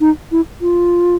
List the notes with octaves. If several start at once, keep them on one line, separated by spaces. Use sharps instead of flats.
D#4
E4
F4